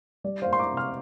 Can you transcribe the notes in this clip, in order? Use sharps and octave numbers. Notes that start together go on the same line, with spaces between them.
G3 D5
C5 F5
A#3
C6
A#5 D6
C3
C6 F6